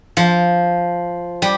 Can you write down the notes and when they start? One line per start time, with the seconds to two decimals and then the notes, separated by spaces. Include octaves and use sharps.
0.17 F3
1.42 G3